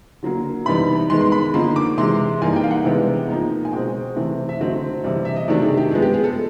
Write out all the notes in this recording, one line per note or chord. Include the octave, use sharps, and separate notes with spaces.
D3 F#3 A#3
C3 E3 G3 B3 D#4 B5
D#3 G#3 B3 C6
C6
B5
D3 F3 A#3 D#4 C6
D6
C3 E3 G#3 C6
E3 G3 A#3 D#4 G#5
G5
F5
F#5
C3 E3 G#3 B3 D4 G5
F3 A#3 D#4
G#5
B2 G#3 C4 G5
C3 E3 A3 C4
E5
D3 F#3 A3 C4 D#5
C3 E3 G3
E5
D#5
C3 D#3 F#3 A3 D4 D5
G#4
G4
F3 G#3 B3 G#4
G4
G#4
A4